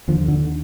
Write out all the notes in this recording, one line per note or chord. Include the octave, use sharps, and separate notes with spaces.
D#2 D3 F3
D3